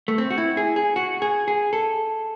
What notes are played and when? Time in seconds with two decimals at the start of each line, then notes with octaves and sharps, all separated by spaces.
0.08 A3
0.18 C4
0.30 F#4
0.38 E4
0.57 G#4
0.76 G#4
0.96 F#4
1.22 G#4
1.48 G#4
1.73 A4